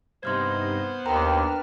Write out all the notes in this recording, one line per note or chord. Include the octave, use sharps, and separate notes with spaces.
G2 C3 B3 D#4 C5 C6 F6 G#6
D#2 D4 A#4 B4 G5 A#5 F6